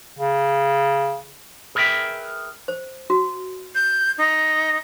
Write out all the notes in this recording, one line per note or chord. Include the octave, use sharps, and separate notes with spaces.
C#3
G#4 A#4 B4 D5 E5 G5
C5
F#4
G6
D#4